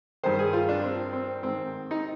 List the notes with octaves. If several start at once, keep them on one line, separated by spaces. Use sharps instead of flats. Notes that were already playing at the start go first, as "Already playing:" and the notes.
G2 D#3 C5
G#4
F4
D4
C4
C4
G#2 D#3 C4
D#4